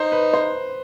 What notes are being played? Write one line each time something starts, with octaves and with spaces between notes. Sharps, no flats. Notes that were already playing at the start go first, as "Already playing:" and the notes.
Already playing: D#4 C5
B4
C5